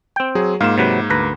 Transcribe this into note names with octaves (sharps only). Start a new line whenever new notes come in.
C4 G5
F#3 G#4
G#2 A#3 F4 F5 E7
C3 F#3 B4
D2 B4 A#5